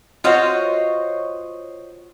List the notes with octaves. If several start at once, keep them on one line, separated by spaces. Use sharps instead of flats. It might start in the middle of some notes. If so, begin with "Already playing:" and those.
F4 F#4 C5 C#5 D#5